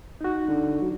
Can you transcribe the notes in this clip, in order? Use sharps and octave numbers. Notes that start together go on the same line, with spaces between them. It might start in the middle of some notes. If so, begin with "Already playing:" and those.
D#4 F#4
D3
F#3